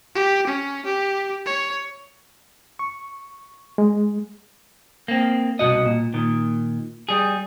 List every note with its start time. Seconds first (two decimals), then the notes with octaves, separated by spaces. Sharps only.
0.15 G4
0.47 C#4
0.86 G4
1.46 C#5
2.79 C#6
3.78 G#3
5.08 A#3 C4
5.59 C2 F#2 B2 F#4 D#5
5.86 A#2
6.14 A#2 D#3
7.09 G3 G#4